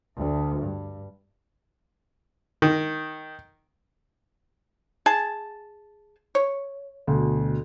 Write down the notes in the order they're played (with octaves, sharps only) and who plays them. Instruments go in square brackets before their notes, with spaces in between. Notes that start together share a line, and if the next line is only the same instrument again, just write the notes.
[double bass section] D2
G2
[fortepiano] D#3
[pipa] G#4 A5
C#5
[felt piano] D2 B2